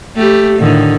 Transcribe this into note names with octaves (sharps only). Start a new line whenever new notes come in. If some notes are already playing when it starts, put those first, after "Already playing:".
A3 G4
A2 D3 D#3